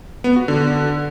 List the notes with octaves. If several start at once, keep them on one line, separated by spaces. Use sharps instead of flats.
B3
F#4
D3